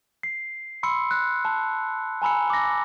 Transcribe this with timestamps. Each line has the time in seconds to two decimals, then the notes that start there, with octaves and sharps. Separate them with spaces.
0.23 C7
0.83 B5 C6 E6 C#7
1.11 F#6
1.45 A5
2.22 G#5 A#5 B5 E6 C#7
2.50 D6 A#6